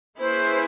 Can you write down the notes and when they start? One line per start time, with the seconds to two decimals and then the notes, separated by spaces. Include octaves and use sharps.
0.18 A#3 C#4 E4 G#4 B4 C5